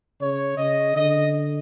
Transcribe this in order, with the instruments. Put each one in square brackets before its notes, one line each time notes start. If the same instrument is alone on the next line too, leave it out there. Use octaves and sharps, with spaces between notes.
[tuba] C#3 [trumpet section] C#5
[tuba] C#3 [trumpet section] D#5
[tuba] D3 [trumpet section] D#5